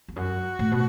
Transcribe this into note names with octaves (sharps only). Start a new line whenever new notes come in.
E2
F#2 F#4
A2
B2